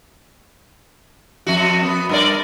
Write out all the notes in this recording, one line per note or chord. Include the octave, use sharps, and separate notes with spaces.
F2 F#4
B3
G2 A#4 D5